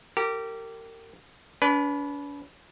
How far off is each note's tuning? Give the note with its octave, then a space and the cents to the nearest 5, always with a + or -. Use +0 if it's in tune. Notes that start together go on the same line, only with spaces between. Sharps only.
G4 -15 A#4 -35
D4 -45 B4 -5